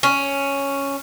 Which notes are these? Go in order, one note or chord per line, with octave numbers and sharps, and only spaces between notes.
C#4